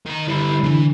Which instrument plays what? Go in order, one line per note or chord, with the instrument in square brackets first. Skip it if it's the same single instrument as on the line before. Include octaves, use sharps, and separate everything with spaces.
[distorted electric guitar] D#3 A#5
[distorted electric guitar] D3 G3 [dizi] E4
[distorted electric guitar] E2 E3 [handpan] D3